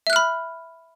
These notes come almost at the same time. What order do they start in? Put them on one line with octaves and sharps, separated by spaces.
E5 F#6 F6 B5